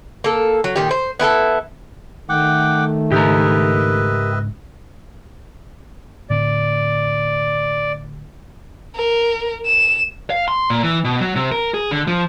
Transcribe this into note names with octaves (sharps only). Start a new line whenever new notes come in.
A#3 A4
F#3
A#2 D#3 G4
C5
B3 E4 G#4 A4
D#3 A3 F#5 G5 D6
G#2 C#3 D4 G4 A#4 B4 D#5 E5
A2 D3 C4 D5
A#4
E7
F5
C6
A#2
E3
B2
F#3
C3
A#4
G#4
D3
F3